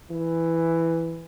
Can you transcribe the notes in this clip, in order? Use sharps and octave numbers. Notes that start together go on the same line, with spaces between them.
E3